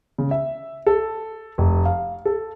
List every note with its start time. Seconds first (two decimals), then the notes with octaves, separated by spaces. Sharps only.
0.18 C#3
0.31 E5
0.86 A4
1.58 F1
1.85 F5
2.25 A4